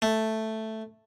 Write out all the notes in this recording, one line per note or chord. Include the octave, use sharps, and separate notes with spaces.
A3